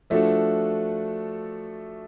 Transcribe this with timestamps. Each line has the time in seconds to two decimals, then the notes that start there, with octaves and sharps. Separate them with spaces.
0.10 F3 A3 D4 F#4 A4